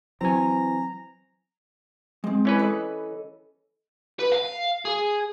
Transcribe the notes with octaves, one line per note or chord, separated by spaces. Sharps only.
E3 F#3 C4 G#5 A#5
G#3 C4
E3 C#4 B4
A4 D#5 B5
B4
F5
G#4